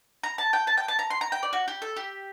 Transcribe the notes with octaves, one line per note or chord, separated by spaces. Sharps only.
A#5
A5
G5
A5
G5
A5
A#5
C6
A#5
G5
D5
F#4
G4
A4
G4